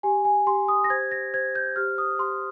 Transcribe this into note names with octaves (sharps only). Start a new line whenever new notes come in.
G4 G#5
G#5
G4 C6
D#6
A#6
C5 G#6
A#6
C5 G#6
G6
G4 F6
D#6
G4 C6